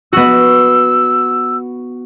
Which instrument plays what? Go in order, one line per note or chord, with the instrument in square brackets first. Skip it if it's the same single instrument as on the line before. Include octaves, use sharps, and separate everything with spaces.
[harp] B3 F#4 [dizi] E6